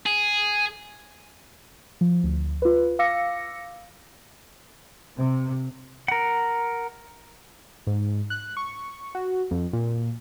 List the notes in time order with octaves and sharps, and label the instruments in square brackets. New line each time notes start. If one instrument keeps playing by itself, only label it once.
[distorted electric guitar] G#4
[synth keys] F3
D2
F4 B4
F5 D6 E6 A#6 C#7
[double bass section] C3
[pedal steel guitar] A#4 F#5
[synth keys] G#2
F#6
C#6
F#4
F2
A#2